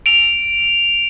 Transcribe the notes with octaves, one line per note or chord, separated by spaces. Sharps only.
D7 F7